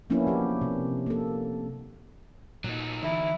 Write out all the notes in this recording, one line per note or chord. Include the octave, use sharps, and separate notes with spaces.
F3 A#3 B3 C#4 D4 E4
F#3 G4
C3
A#3 A4
A#2 F#3 D#4
D3 E3 E4